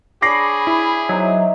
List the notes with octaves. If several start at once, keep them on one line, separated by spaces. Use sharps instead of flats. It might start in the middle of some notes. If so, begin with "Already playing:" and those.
D4 G#4 C#5 D5 B5 D6 A#6 C7
E4
F#3 D#4 C5 E5